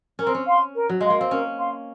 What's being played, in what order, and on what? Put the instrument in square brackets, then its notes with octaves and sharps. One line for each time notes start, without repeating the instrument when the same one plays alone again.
[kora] C#4 [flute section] A#4
[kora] C4
C#4
[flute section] F5 C6
A#4
[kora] F#3
[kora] G#3 [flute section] F5 C6
[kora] A#3
C4
[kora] C#4 [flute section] A#4
[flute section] F5 C6